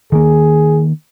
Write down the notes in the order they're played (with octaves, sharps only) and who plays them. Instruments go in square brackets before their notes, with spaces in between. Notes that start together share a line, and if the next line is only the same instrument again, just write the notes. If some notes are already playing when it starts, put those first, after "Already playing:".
[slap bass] D#3 A#3 [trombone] G#4